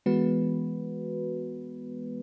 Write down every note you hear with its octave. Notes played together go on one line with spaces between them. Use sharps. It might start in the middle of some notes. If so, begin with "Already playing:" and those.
E3 G#3 B3 F#4 B4